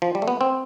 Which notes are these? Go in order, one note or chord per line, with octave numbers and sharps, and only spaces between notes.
F3
G3
A3
B3
C4